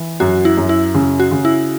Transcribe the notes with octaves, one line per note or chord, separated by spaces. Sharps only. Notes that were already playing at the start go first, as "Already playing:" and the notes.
Already playing: E3
F#2 F#4
E4
F#2
E4
C#3
F#4
C#3
E4